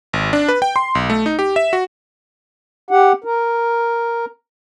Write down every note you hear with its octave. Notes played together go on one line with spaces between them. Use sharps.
G#1
D4
B4
G5
C6
B1
A3
D#4
G4
E5
F#4
G4 F#5
A#4